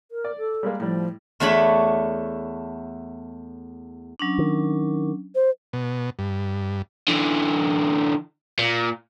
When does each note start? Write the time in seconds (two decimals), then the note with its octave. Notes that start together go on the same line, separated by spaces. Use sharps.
0.11 A#4
0.25 D5
0.38 A4
0.63 G3 G#3 A#3
0.80 A2 F3 G3
1.40 E2 A3 D4 C#5 B5
4.19 F#3 C#4 D4
4.38 D#3
5.35 C5
5.73 B2
6.19 G2
7.08 D3 E3
8.59 A#2